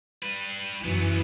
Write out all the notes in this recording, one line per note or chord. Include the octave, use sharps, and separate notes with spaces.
G3 B4
F#2 E3 F#3 B3